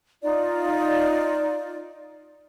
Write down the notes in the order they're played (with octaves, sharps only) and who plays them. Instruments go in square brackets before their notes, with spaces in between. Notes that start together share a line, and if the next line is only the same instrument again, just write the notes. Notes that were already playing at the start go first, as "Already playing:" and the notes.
[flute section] D#4 F4 D5